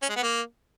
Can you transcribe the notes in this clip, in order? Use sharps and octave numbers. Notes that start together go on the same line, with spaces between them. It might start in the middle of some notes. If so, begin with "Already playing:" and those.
C#4
G#3
B3
A#3